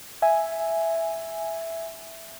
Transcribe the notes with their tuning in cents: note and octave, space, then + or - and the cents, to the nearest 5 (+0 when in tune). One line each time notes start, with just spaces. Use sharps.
E5 +0 G#5 +0